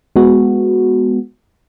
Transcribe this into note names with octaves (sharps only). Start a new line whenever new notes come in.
G#3 B3 F#4